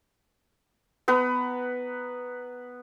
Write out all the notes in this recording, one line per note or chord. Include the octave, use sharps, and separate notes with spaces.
B3 B4 A#5